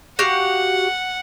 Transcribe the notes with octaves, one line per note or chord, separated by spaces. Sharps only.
F#4 G4 F5 F#5